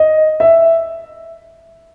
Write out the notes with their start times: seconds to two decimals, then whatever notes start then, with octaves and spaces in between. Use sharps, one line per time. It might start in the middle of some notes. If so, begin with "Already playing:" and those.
Already playing: D#5
0.40 E5